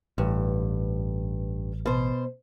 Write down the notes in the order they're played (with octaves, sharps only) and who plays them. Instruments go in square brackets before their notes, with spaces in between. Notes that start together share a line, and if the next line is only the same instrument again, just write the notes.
[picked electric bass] A1 [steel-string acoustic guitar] G2
[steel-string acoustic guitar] B2 C5